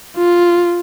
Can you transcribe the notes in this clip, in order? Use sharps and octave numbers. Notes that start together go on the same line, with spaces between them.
F4